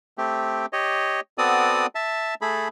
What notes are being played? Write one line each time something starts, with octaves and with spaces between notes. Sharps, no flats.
A3 C4 G4
G4 C#5 D#5
B3 C4 F#4 A4 D5 D#6
E5 A5
A3 G#4 A4 B5